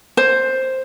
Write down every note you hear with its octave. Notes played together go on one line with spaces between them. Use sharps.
C5